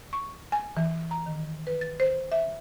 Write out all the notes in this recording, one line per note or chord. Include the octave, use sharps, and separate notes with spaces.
C#6
G#5
E3
A#5
D#3
B4
A6
C5
E5